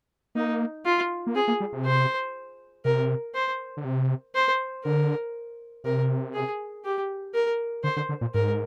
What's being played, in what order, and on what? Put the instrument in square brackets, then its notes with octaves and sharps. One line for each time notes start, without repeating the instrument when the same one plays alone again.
[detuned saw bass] A#3 [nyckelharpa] D#4
[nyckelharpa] F4
[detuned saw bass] A#3
[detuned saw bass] C4 [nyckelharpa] G#4
[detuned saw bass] A#3
G3
C3
[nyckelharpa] C5
[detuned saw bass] C3 [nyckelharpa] A#4
[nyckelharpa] C5
[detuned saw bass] D3
C3
[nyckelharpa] C5
[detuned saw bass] D3 [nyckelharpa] A#4
[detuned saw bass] C3 [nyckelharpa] A#4
[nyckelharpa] G#4
G4
A#4
[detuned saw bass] D3 [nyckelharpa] C5
[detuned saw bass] D3
D3
A#2
[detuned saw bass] G#2 [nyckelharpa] A#4